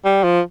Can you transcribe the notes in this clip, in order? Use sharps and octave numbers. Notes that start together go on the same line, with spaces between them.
G3
F3